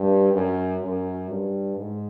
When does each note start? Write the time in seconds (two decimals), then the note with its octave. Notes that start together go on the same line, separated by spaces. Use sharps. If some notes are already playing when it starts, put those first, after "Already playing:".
Already playing: G2
0.33 F#2
0.82 F#2
1.30 G2
1.77 G#2